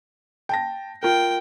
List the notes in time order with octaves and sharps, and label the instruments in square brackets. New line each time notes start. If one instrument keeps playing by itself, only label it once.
[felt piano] G5 A5 A#6
[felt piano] F4 A#4 [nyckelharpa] G5